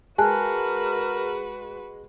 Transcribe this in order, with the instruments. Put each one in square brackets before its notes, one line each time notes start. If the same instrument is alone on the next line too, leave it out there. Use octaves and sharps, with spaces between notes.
[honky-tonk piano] G#3 [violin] F#4 B4 [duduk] A#4 [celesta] G#5 A5 F#6